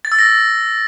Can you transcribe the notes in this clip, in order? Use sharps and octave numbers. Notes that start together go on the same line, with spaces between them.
A6
E6
A#6